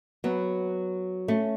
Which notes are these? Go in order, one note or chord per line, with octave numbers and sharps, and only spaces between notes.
F#3 B3
A3 C#4